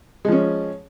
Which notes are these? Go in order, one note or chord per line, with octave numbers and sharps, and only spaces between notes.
F3 G#3 C#4